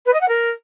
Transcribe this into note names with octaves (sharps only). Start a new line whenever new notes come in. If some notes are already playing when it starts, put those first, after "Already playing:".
B4
D#5
F#5
A#4